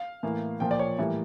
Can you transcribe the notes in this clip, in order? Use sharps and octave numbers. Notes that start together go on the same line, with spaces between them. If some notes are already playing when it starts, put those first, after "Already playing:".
Already playing: F5
A2 E3 A#3
A#2 F3 A#3 G5
D5
C#5
A2 E3 G3 A#3